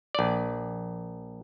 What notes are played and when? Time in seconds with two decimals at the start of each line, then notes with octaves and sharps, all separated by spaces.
0.15 A#1 D5